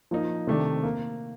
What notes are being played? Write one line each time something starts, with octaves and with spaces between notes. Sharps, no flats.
F3 A#3 D#4
C3 D#3 A3 D4
A#3